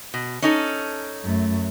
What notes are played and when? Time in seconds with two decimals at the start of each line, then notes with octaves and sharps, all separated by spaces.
0.14 B2
0.42 C#4 D#4 A4
1.24 F#2 A3